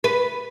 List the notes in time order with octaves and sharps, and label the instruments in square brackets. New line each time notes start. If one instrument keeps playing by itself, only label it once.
[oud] B4